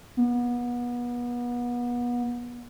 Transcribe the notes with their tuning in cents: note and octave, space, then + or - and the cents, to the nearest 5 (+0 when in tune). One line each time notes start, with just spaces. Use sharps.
B3 -30